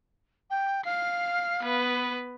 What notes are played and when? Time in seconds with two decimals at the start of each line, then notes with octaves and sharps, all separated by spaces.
0.50 G5
0.85 F5 F6 C7
1.63 B3 B4